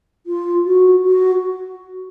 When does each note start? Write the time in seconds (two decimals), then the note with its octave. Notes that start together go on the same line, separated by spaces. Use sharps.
0.27 F4
0.65 F#4
1.04 F#4